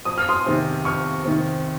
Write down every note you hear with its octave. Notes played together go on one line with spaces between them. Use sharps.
F2 D#6
F6
C6 D#6
C3 D#3
F2 C#6 F6
C3 D#3